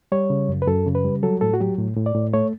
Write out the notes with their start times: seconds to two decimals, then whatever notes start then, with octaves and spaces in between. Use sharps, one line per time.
0.12 G3 C#5
0.30 C#3
0.49 F#2
0.62 B4
0.67 F#2 A4
0.86 C#3
0.95 B4
1.05 G3
1.23 F#3 A4
1.41 A2 A4
1.54 F#4
1.60 F#3 G4
1.78 A2
1.97 A2
2.06 D5
2.15 A2
2.33 A3 C#5